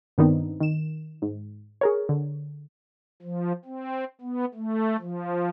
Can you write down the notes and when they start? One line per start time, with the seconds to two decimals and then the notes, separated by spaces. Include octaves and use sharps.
0.18 G2 D#3 B3 C4 D4 D#4
0.61 D#3 E7
1.22 G#2
1.81 G#4 A#4 C#5
2.09 D3
3.22 F3
3.65 C4
4.21 B3
4.54 A3
4.99 F3